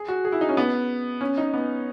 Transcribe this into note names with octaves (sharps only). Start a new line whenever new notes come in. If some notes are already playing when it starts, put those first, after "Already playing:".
Already playing: G#4
F#4
G#4
E4
D#4
C#4
B3
C#4
D#4
B3